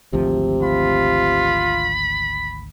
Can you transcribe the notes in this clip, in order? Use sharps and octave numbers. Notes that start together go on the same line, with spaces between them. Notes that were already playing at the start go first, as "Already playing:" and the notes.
G#1 D2 C3 F3
F4 B5